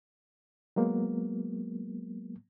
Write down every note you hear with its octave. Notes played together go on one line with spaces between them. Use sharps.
F#3 G#3 A#3 B3